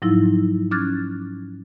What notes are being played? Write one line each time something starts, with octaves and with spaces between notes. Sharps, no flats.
G#2 F3 F#3 D#4 E4 E6
C#4 D6 F6 F#6 G#6 A6